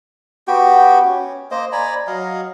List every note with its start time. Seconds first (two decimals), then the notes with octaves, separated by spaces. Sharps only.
0.48 B3 F#4 G4 G5
1.05 C#4
1.51 A#3 C5 D#5
1.72 D5 G#5 A#5 B5
2.07 F#3 D#5 F5